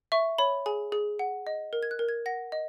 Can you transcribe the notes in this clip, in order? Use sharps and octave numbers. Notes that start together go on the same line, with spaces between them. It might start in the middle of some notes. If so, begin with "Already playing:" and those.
E5 C#6
C#5 B5
G#4 G#5
G#4
F#5
D#5
A#4
G#6
F#6
A#4
G#6
F#5 A#6
D#5